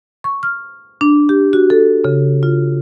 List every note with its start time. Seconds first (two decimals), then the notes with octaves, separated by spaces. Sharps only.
0.24 C#6
0.43 F6
1.01 D4
1.29 G4
1.53 F#4
1.70 A4
2.04 C#3
2.43 F4